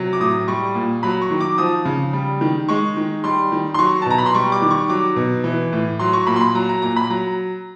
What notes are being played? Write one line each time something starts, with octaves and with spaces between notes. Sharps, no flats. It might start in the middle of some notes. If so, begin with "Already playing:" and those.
Already playing: C3 F#3
D6
A2 D#6
G3 C#6
A#2
F#3 B5
C#6
D#3
D6
F3 D#6
C#3
G3
D#3
G#3 C#6
D#3
G3 C6
D#3
C6
F#3 C#6
A5
B2 A#5
B5
C6
G3 C#6
D6
D#3
C#6
F#3 D6
B2
E3
A2
F#3 C6
C#6
A#2 B5
C6
B5
F#3 A#5
A#5
A#2 A#5
B5
F#3 A#5